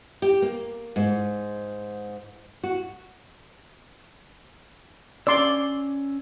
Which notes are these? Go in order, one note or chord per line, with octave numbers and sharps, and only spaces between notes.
G4
A#3
G#2
F#4
C#4 D5 C6 E6